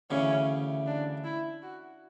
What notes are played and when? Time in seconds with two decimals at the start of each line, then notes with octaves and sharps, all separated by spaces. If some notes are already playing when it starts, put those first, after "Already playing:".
0.10 D2 C#3 E3 C#4
0.86 D4
1.24 E4
1.62 F#4